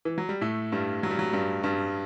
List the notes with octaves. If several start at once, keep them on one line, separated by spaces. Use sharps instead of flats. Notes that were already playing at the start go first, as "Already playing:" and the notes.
E3
F#3
G3
A2 A3
G2 G3
F#3
G3
F#3
G2 G3
G2 G3